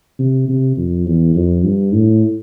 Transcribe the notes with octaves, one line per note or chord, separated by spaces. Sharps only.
C3
C3
F2
E2
F2
G2
A2